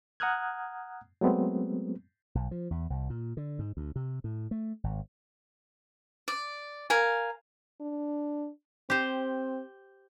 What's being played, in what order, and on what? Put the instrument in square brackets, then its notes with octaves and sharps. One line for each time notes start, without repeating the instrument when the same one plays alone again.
[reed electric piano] F#5 A#5 D#6 F6 F#6 G#6
F#3 G#3 A3 B3 C4
[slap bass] B1
F3
E2
C2
A#2
D3
G#2
D2
C3
A2
A3
G#1
[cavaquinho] D5
A#4 F5 G#5
[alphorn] D4
[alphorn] C4 [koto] G4 C5